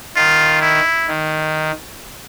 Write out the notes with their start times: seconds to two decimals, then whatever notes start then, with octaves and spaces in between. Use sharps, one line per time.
0.16 D#3 F4
0.62 E4
1.08 D#3